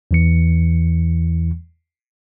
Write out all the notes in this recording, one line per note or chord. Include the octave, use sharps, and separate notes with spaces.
E2 E3 C#7